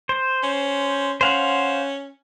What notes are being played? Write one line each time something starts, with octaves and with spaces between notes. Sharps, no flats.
C5
C#4
C#4 C5 F5 F#5